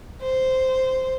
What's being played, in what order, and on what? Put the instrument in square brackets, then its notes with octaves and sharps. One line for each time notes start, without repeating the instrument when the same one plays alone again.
[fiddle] C5